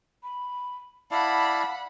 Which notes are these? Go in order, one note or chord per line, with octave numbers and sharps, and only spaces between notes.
B5
E4 D5 F5 F#5 A5 B5